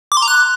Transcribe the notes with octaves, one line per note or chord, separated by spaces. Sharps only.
D6
C6
A#5
F#6